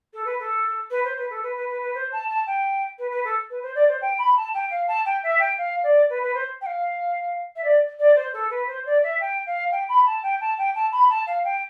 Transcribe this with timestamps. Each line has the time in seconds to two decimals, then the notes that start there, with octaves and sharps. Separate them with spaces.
0.14 A4
0.25 B4
0.40 A4
0.91 B4
1.04 C5
1.17 B4
1.30 A4
1.43 B4
1.56 B4
1.69 B4
1.82 B4
1.94 C5
2.12 A5
2.29 A5
2.47 G5
2.99 B4
3.11 B4
3.25 A4
3.50 B4
3.63 C5
3.75 D5
3.88 C5
4.01 G5
4.18 B5
4.36 A5
4.54 G5
4.71 F5
4.88 A5
5.05 G5
5.23 E5
5.39 G5
5.58 F5
5.83 D5
6.10 B4
6.23 B4
6.34 C5
6.61 G5
6.66 F5
7.56 E5
7.64 D5
7.99 D5
8.16 C5
8.34 A4
8.50 B4
8.67 C5
8.86 D5
9.03 E5
9.20 G5
9.46 F5
9.72 G5
9.89 B5
10.06 A5
10.23 G5
10.41 A5
10.58 G5
10.75 A5
10.92 B5
11.09 A5
11.27 F5
11.44 G5